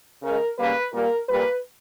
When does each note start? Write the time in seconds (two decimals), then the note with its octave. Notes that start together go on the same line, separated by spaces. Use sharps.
0.22 C#3 G#3 A#4
0.57 C#3 G3 A#3 B4
0.92 A#2 G3 A#3 A#4
1.28 A#2 G3 A#3 B4